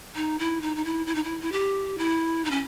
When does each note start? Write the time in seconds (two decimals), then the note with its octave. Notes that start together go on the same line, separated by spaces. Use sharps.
0.15 D#4
0.39 E4
0.61 D#4
0.76 D#4
0.85 E4
1.07 E4
1.15 D#4
1.24 E4
1.41 E4
1.52 G4
1.98 E4
2.45 D#4
2.51 C#4